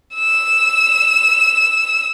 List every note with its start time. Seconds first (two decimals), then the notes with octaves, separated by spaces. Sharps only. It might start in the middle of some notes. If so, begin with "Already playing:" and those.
0.17 E6 E7